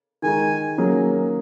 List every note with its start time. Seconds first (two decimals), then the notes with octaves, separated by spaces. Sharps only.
0.22 D#3 G#3 D#4 G#5
0.78 D#3 F#3 A#3 C#4 G#4